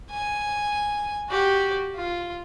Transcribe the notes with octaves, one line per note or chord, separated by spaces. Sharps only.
G#5
F#4 G4
F4